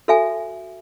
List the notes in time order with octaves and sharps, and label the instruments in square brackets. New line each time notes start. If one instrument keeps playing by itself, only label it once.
[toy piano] F#4 A4 E5 G#5